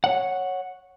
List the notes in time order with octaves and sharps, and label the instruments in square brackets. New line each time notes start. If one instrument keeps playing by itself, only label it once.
[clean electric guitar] C#5 F#5